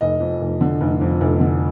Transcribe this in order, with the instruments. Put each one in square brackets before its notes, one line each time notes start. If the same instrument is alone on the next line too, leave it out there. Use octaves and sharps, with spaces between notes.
[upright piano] F1 D#5
F2
F1
D3
F1
F2
F1
D3